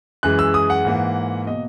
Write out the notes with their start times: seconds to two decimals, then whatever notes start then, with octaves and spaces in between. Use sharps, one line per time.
0.23 F#2 E3 G#3 F#6
0.39 E6
0.54 D#6
0.70 F#5
0.85 G#2 E3 A#3
1.47 B2 A#3 D#5